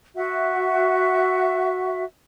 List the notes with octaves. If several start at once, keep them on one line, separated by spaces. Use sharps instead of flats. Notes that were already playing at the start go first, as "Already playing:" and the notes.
F#4 E5